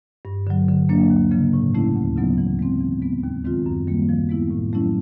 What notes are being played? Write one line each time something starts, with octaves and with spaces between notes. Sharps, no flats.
G2
D3 F#3
D3
F#3 A#3 D4
D#2
C#3 F3 A#3
A2
E3 A3 C#4 E4
D2
C#3 F#3 B3 D#4
E3
G#3 C4
E3
G#3 B3
D#2
D#3 G#3 C4 F4
F#2
D#3 G3 A#3
F3
G#3 B3 E4
A2
F#3 A3 C#4 E4